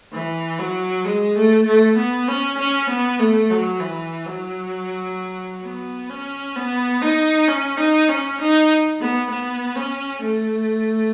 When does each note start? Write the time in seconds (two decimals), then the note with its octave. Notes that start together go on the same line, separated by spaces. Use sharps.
0.14 E3
0.60 F#3
1.05 G#3
1.36 A3
1.66 A3
1.97 B3
2.28 C#4
2.58 C#4
2.89 B3
3.20 A3
3.51 F#3
3.80 E3
4.26 F#3
5.64 B3
6.10 C#4
6.56 B3
7.02 D#4
7.48 C#4
7.78 D#4
8.09 C#4
8.39 D#4
9.01 B3
9.30 B3
9.76 C#4
10.22 A3